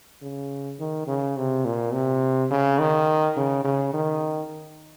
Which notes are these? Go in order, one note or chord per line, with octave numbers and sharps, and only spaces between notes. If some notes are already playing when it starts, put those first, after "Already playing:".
C#3
D#3
C#3
C3
A#2
C3
C#3
D#3
C#3
C#3
D#3